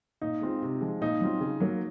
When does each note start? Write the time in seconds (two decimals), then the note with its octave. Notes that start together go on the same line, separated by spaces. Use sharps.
0.21 A#2 D#4
0.41 G#3 C4 F4
0.62 C3
0.81 F3 G#3
1.01 A#2 D#4
1.21 F#3 C4 F4
1.40 C#3
1.60 F#3 A#3